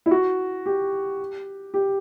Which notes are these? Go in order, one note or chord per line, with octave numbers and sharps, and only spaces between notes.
E4
F#4
G4
G4